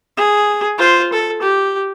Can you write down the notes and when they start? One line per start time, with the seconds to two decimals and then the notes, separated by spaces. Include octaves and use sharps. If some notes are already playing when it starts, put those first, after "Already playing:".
0.17 G#4
0.78 F4 C5
1.13 A4
1.42 G4